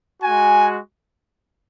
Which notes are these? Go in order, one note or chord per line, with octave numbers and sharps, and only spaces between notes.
G#3 F#4 G#5